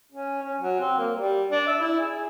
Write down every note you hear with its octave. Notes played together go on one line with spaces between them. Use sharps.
C#4
C#4
F#3
C4
A#3
G3
D4
E5
E4
G#4